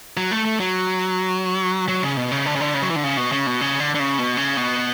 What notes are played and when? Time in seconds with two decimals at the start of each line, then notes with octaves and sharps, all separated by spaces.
0.17 F#3
0.31 A3
0.45 A3
0.60 F#3
1.89 F#3
2.03 C#3
2.17 B2
2.32 C#3
2.46 D3
2.56 C#3
2.61 D3
2.74 C#3
2.82 F#3
2.90 E3
2.96 D3
3.04 C#3
3.17 B2
3.32 C#3
3.47 B2
3.61 C#3
3.80 D3
3.95 D3
4.00 C#3
4.18 B2
4.37 C#3
4.57 B2